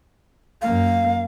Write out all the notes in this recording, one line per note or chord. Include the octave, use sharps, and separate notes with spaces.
F#2 A#3 F5